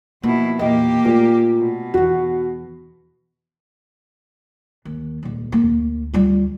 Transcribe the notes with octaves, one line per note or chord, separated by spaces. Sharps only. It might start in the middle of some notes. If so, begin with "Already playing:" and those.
B2 F3 A#3 E4
E2 A#2 A#3 G4 D#5
A#2 A3
B2
E2 E3 F#4
D#2
D#1 C#2
A#3
D2
G3 F4